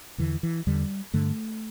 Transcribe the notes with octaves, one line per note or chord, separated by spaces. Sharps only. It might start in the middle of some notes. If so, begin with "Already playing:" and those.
E2 D3 E3
E3
E2 D3 G3
G2 D3 A3